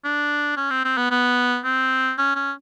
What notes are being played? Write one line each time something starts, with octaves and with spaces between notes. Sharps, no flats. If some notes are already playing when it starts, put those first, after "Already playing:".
D4
C#4
C4
C4
B3
B3
C4
C#4
C#4